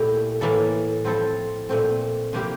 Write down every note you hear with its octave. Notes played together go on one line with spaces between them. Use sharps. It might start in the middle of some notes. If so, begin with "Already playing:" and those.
Already playing: A#2 A3 E4 G4
A2 E3 A#3 E4 A4
F3 C4 E4 A4
A#2 A3 C4
C3 F3 A#3 E4 G4